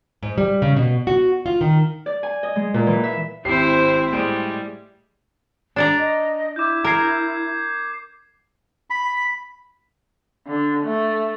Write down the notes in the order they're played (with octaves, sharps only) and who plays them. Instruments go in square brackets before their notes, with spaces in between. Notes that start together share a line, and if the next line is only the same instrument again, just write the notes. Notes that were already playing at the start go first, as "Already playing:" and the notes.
[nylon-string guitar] G#2
G3
C#3
B2
F#4
F4
D#3
[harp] D5
G#5
D#5
G#3
A#2
E3
E5
[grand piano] G#1 G4 C7 [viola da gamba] C4 E4 C5
[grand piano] A2 G#3 D7 [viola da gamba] G3
[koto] D4 D5 A#5
[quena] D#5
[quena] E4 [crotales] D6 G6
[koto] A#4 [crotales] G#6 C7
[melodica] B5
[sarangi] D3
A3